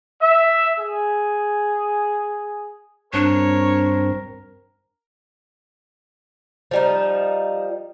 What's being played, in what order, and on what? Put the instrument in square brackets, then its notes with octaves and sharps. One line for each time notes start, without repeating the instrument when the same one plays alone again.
[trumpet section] E5
G#4
[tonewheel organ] G2 C4 [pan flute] D4 [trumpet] A#4 [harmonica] C#5
[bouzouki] F3 G3 D#4